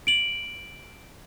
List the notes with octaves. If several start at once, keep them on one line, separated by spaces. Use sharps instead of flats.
D7 F#7